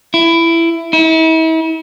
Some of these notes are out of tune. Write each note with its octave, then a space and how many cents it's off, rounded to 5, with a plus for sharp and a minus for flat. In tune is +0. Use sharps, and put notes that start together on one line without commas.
E4 +15
E4 -40